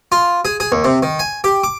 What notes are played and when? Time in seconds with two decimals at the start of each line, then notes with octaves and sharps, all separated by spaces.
0.12 F4
0.45 G#4
0.60 G#4
0.72 D#2
0.84 C3
1.03 D#3
1.19 G#5
1.44 G4
1.64 D6